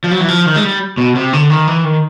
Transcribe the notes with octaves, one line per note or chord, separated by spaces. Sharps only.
F3
F#3
E3
F3
D#3
G#3
G3
B2
C3
D3
D#3
E3
D#3